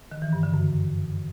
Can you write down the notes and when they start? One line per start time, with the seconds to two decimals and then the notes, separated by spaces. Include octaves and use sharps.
0.12 D#3
0.22 E3
0.33 G2
0.43 D3
0.54 F#2